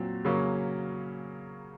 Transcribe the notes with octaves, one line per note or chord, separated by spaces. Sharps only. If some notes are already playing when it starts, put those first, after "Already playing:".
Already playing: A#2 F#3 C4
C#3 F#3 A#3 C#4